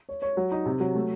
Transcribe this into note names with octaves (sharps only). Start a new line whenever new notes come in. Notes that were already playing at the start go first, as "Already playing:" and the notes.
C#5
C#5
F#3
D#4
C3
F#3
A3